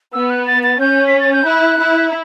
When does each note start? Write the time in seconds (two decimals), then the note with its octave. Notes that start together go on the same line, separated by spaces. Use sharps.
0.13 B3 E6
0.30 F#6
0.47 A6
0.63 A6
0.80 C#4 G6
1.07 B6
1.20 A6
1.33 G6
1.46 E4 F#6
1.80 E4